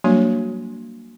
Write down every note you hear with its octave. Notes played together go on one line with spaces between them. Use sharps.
F#3 G3 A#3 D4 F#4